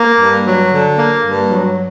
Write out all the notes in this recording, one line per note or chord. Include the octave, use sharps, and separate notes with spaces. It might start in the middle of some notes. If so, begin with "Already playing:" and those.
Already playing: A#3
G2
F#3
D3
A#3
G2
F#3